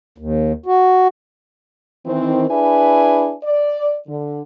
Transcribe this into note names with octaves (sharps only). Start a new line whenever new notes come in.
D#2
F#4
D#3 E3 C4
D4 E4 G#4 B4 E5 G#5
D5
D3